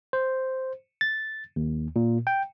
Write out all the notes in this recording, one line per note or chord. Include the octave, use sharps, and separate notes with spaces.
C5
A6
D#2
A#2
G5